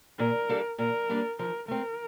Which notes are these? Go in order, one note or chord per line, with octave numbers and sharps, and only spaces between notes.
A#2 A#4
G3 A#3 D4 A4
A#2 A#4
G3 A#3 D4 A4
F3 A#4
A3 C4 A#4